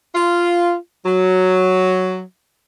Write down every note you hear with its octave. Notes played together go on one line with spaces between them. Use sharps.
F4
F#3